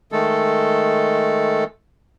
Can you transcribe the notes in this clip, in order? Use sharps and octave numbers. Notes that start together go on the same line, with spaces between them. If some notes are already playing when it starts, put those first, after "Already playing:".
D#3 G#3 A3 A4